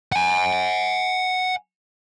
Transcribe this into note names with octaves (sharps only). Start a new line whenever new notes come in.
F#5 G#5